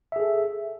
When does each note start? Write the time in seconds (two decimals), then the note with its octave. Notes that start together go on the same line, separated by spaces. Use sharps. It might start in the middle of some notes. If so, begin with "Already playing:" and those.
0.12 E5
0.16 G#4
0.20 A4